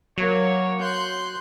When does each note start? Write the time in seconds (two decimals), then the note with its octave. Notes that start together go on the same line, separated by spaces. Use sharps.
0.18 F#3 A#3 C#5
0.81 C6 F#6 G6